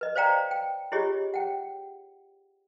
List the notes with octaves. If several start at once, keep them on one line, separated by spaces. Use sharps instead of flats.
B4 D#5
C5 D5 F5 G5 A#5
G5
E4 F4 G4 G#4 C#5 D#5
F#5 G5